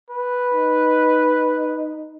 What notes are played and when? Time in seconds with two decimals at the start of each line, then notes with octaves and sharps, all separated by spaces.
0.10 B4
0.54 D#4